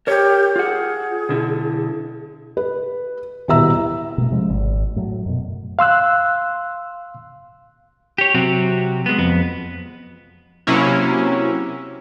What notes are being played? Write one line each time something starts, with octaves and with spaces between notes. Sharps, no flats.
G4 A#4 C#5
F4 G#4 F#5
B2 D3 E4
B4
D#1 B2 E4 E5 A#5 E6
B2 A3
C3 F3 G#3 C#4
G#1
A2 F#3
F#2 B2
F5 C6 E6 F#6
G4 C#5
C3 F#3 C4 F#4
G#3 B3
F2 B3
C3 F#3 A#3 C#4 E4